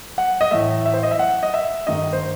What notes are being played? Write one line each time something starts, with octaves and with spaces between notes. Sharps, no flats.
F#5
D#5
A2 E3 A3 E5
E5
C5
D#5
E5
F#5
D#5
E5
G2 D#3 A3 D#4 D#5
C5